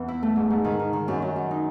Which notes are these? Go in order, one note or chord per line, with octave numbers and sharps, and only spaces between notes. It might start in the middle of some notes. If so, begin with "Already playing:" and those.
Already playing: E2 E3
E4
A3
G#2
G#2
D#3
D#3
D#3
F#2
F#2
F#3
D#4